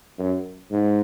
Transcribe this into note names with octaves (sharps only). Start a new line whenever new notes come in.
F#2
G#2